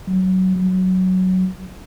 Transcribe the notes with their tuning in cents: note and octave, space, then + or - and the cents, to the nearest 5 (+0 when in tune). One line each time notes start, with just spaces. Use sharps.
F#3 +15
F#3 +5